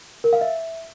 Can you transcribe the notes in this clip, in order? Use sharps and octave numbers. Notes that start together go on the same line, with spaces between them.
A#4
F5
E5